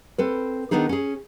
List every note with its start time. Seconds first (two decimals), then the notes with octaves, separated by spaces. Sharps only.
0.18 C4 A4 B4
0.71 D#3 G3 B3 D4 D#4 G#4
0.89 C#4 G#4